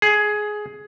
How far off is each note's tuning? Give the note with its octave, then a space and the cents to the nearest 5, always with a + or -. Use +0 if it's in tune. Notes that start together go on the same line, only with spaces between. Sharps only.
G#4 +15